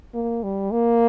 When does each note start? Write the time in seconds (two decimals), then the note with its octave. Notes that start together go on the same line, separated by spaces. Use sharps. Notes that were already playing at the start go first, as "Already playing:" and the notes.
0.15 A#3
0.44 G3
0.72 A#3